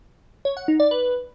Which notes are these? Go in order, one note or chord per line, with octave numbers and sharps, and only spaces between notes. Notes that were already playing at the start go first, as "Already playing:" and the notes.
C#5
F#5
D#4
D5
B4